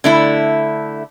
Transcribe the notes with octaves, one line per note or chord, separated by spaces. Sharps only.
D3 A3 E4